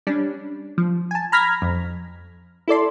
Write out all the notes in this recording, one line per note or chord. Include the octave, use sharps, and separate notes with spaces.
G3 C#4 D4
F3
G#5 A5
A#5 B5 F6 G#6 A#6 B6
F2
E4 A4 D5 C6